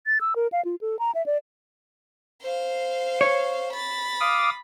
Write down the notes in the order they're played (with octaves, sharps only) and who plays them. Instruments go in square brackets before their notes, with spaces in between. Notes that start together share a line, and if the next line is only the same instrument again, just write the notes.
[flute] A6
E6
A#4
F5
F4
A4
A#5
E5
D5
[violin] C5 F5
[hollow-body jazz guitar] C#5
[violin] B5 A6
[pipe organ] F5 D6 D#6